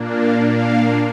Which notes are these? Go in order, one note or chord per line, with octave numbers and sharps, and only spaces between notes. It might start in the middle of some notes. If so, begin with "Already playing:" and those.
Already playing: A#2 A#3 D4
F5
F5